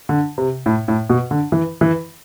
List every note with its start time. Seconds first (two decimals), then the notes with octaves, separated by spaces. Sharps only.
0.09 D3
0.38 C3
0.66 A2
0.88 A2
1.10 B2
1.31 D3
1.52 E3
1.81 E3